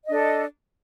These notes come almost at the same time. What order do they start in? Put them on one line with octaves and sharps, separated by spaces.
D#5 D4 A4